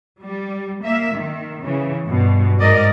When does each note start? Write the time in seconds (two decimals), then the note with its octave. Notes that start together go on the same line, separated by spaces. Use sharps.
0.23 G3
0.83 A#3 E5
1.16 D#3
1.62 C#3 E3
2.07 G2 B2
2.60 G#2 A#4 D5 D#5